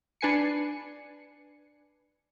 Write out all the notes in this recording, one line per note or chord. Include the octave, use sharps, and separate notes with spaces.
D4 B4 G#5 C7 C#7